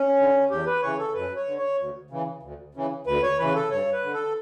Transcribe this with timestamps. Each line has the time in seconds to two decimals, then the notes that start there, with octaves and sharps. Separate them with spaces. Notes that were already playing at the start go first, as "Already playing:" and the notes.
Already playing: C#4
0.19 D3
0.50 E2 G4
0.67 B4
0.83 C#3 E3 C#5
0.99 A4
1.14 F#2 B4
1.36 C#5
1.47 D3
1.57 C#5
1.79 D2
2.10 C#3 E3
2.43 D2
2.75 C#3 E3
3.07 D2 B4
3.23 C#5
3.39 C#3 E3 B4
3.55 A4
3.71 G2 C#5
3.93 B4
4.03 D3
4.14 A4